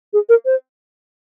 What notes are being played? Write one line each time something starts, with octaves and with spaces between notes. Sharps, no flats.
G#4
A#4
C5